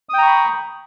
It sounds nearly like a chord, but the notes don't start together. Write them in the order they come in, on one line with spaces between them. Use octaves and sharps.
D#6 G5 A#5 C#6 B5